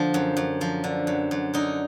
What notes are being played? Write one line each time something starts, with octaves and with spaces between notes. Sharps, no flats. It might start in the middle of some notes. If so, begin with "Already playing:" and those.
Already playing: D3 F3
F#2
F#2
F3
D3
F#2
F#2
D3 D#4